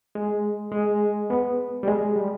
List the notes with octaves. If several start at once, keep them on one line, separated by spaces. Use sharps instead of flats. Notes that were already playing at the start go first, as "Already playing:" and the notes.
G#3
G#3
B3
G3
G#3
G3